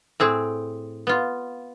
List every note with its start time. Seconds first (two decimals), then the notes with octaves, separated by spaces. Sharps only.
0.20 A2 C4 G#4
1.07 B3 F4